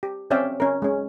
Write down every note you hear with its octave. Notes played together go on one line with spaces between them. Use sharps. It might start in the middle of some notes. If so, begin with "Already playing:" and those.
G4
C4 C#4 D5 E5 F5 G5
C#4 A#4
G#3 C#4